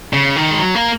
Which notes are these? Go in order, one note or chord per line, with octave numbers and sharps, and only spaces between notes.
C#3
D#3
G#3
F#3
A#3